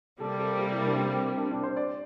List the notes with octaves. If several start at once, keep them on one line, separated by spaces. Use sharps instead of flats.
C3 G3 A#3 A4
A4
G4
E4
D4
C4
D4
D4
C5
D5